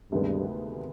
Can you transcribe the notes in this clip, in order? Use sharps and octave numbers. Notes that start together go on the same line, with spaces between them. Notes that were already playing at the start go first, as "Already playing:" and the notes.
D2 G2 C3 D#3 G#3 B3